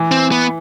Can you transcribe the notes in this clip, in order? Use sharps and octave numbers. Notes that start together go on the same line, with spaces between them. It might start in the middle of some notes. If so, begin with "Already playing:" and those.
Already playing: E3
C4
B3